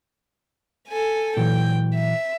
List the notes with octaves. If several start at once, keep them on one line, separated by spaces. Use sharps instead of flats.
A4 G#5
A#2 E3 F#3 G5
E5